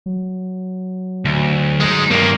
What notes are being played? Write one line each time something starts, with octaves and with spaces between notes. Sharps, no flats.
F#3
D2
G#3 D#4
G2 D#3 A#3